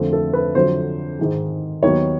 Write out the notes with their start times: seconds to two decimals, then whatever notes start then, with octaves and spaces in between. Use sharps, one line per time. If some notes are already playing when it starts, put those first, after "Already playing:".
Already playing: F2 D3 F3 A3 C4
0.13 A4
0.33 B4
0.55 F2 D3 F#3 C5
1.19 G#2 D#3 G#3
1.83 D#2 D#3 F#3 B3 C#5